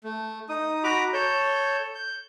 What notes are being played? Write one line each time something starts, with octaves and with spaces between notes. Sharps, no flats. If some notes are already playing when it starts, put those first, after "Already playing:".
A3
D#4 D#6
F#4 A#5 B5 D6
A4 C#5 G6
G6